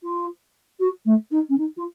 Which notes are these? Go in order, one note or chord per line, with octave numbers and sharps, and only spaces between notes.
F4
F#4
A3
D#4
C#4
D#4
F4